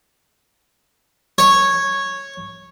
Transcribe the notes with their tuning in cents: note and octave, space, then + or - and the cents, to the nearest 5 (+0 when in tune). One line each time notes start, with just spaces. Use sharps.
C#5 -10